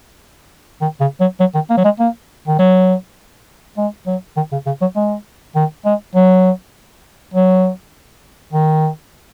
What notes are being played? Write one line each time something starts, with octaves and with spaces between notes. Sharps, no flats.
D#3
C#3
F#3
F#3
D#3
A#3
F#3
G#3
A#3
D#3
F#3
G#3
F#3
D#3
C#3
C#3
F#3
G#3
D#3
G#3
F#3
F#3
D#3